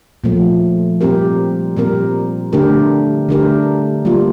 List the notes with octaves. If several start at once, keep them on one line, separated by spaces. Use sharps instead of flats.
A#2 F3 A3
A#2 G3 C4 G4 A#4
A#2 G3 C4 G4 A#4
D3 A3 D4 G4 A#4
D3 A3 D4 G4 A#4
G3 A#3 F4